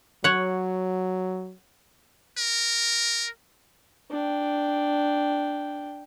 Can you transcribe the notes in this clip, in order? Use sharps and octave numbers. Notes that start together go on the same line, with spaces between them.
F#3 C#5 F#5
A#4
D4 G5